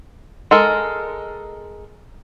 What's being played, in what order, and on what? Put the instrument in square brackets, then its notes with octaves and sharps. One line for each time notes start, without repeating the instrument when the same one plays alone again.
[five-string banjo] G#3 A4 A#4